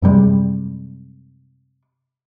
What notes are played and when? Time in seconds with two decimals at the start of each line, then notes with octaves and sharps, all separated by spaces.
0.02 F#2 C3 G3 G#3